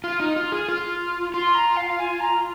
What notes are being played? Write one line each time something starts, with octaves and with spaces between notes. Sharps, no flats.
F4 F6
D#4
F4
G#4
F4
F4 C6
A#5
F5
G#5
A#5